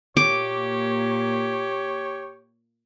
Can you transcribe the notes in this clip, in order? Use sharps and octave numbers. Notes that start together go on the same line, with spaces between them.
A#2 A#3 G4 C#5 D6